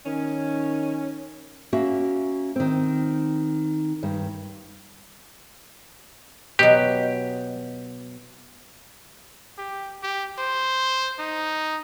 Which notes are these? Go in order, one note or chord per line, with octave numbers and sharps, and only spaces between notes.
D#3 C#4
A#3 C#4 F#4 E5
D#3 C4
G2 D#3
B2 F#3 G4
G4
G4
C5
D#4